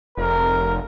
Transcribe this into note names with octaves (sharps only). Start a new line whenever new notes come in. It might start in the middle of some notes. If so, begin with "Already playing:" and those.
F1 A#4